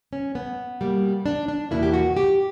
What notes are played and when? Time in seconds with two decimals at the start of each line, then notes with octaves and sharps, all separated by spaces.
0.13 C#4
0.35 B3
0.81 B2 G3 A#3
1.26 D4
1.48 D4
1.71 E2 B2 A#3 E4
1.83 G4
1.93 F#4
2.17 G4